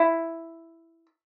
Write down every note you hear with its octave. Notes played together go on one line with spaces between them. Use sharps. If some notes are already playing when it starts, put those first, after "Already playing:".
Already playing: E4